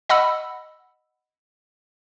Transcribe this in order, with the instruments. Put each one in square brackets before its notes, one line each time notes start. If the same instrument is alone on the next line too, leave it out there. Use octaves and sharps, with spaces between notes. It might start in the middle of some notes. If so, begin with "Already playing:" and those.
[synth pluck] D#5 F#5 B5 E6